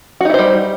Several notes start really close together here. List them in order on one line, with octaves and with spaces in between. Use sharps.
F#4 D#4 E4 C5 G3